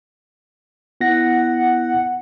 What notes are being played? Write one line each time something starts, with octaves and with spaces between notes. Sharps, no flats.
B3 E4 F#5 A#6